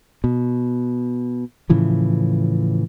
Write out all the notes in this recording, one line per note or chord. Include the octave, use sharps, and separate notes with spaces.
B2
A2 C#3 E3 F3